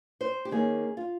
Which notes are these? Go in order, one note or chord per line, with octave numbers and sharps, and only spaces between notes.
C5
G4
D#3 A#3 C#4 G#4
F4